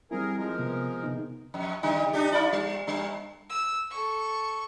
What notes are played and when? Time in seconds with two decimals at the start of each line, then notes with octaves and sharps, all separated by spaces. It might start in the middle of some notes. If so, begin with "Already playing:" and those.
0.11 G3 C4 E4 G#4 A#4
0.38 F3 G#3 A#4
0.58 C3 B3
1.03 C3 B3 D#4
1.54 F2
1.83 C#3 G3 D#4
2.13 D4 D#4 G4
2.32 D#4 F4 D5
2.53 G3
2.87 G2 G3 D4
3.50 E6
3.91 A4 C#6